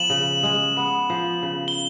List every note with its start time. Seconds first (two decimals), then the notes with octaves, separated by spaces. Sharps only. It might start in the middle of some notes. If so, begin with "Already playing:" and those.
Already playing: F3 B3 E7 F#7
0.10 C#3
0.43 G#3
0.77 B3
1.10 F3
1.42 C#3
1.68 G7